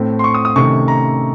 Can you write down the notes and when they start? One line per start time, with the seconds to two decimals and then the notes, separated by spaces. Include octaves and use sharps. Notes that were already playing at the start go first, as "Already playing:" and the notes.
Already playing: A2 A3 C4
0.19 C6
0.24 C#6
0.34 D#6
0.45 D#6
0.56 C3 D#3 A3 C#4 C#6
0.88 A#5